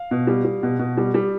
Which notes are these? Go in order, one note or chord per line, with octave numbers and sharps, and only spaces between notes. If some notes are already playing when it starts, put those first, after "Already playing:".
Already playing: F5
B2
G3
G3
B2
B2
G3
G3